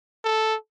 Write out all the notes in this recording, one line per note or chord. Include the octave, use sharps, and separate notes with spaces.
A4